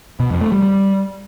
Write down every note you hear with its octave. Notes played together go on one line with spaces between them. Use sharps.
B2
F2
A3
G3
G3